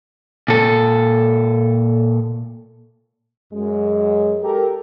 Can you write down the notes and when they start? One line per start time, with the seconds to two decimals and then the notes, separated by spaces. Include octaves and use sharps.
0.48 A#2 A4
3.53 F#2 G#3
4.42 G4 A4 A#4